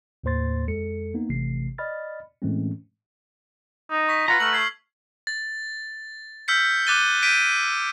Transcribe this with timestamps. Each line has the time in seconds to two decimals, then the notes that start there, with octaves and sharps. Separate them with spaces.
0.24 D#2 A2 A#3 C5 C6 A6
0.68 F2 G#3 A4 C#7
1.14 A#3 B3 D#4
1.30 G#1 C3 E3 A3 C7
1.78 D5 D#5 B5 F6 A6
2.42 A2 E3 G#3 A3 C4 C#4
3.90 D#4
4.09 C#6 B6
4.28 F4 B4 F#5 A#5
4.40 A3 F6 F#7
4.53 G#6 C7
5.27 A6
6.48 E6 F6 G6 B6 C#7
6.87 D6 F#6 A6 D#7 G7
7.22 G6 B6 D7 D#7